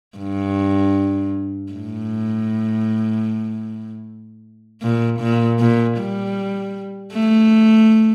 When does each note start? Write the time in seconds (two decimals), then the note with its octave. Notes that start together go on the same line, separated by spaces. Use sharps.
0.18 G2
1.73 A2
4.82 A#2
5.20 A#2
5.59 A#2
5.98 G3
7.13 A3